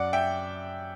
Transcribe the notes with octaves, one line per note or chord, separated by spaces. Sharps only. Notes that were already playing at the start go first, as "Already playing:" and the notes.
Already playing: F#2 D5 F#5
E5 G5